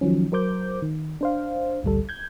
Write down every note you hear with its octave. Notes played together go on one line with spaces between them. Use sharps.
D#3 F3 F#3 C#4
F#3 A#4 C5 D6 G6
D#3
D4 C5 F5
A1 D2 G3 A4
G6 G#6